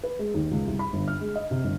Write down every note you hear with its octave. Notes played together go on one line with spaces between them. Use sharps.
B4
G#3
D#2
C#2
C2
B5
G1
F6
G#3
D#5
C3
G1